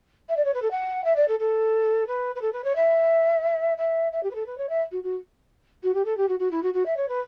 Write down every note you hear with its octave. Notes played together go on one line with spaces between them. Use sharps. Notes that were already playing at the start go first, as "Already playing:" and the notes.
E5
D5
C#5
B4
A4
F#5
E5
D5
A4
A4
B4
B4
A4
B4
C#5
E5
E5
E5
G4
B4
A4
B4
C#5
E5
F#4
F#4
F#4
G4
A4
G4
F#4
F#4
E4
F#4
F#4
E5
C#5
B4